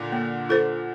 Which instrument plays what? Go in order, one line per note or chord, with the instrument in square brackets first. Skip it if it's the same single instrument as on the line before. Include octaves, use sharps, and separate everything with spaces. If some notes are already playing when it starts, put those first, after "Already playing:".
Already playing: [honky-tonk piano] A#2 D3
[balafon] A#3
F4 A4 C5